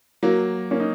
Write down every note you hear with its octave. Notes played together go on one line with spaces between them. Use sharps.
F#3 A#3
A#3 C#4
D#4